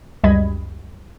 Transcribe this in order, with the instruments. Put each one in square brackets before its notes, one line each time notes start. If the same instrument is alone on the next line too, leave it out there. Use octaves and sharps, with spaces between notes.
[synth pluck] C#2 F#2 G3 D#5 B5 G#6